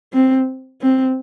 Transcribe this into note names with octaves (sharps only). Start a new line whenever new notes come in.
C4
C4